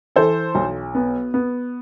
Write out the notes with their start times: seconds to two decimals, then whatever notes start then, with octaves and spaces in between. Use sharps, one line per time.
0.16 E3 A4 C5
0.55 B1
0.95 B3
1.34 B3